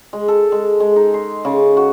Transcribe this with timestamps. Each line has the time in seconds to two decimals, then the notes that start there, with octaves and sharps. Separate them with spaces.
0.13 G#3
0.28 A4
0.52 G#3
0.80 G#3
0.96 D#4
1.14 C6
1.45 C#3
1.77 F#4